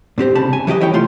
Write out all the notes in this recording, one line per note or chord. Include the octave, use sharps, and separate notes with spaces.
G2 C4 G4 C5
C2 C#3 A5 B5
G#5
E3 F#3 G4 D#5
D2 E4 C#5 G5
C2 A3 F4 C6